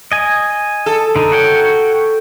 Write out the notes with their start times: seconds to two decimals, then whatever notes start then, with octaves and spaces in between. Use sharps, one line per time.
0.12 D#5 G#5
0.86 A4
1.16 D3 D#4
1.32 F#4 C#5 G5